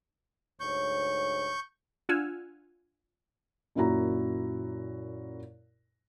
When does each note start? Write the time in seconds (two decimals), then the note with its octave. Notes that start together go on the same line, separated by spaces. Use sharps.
0.60 D2 G#2 C#5 C#6 G6
2.09 D4 F4 F#5 G#5 E6 F6
3.75 F#2 A#2 E4 F#4 A#5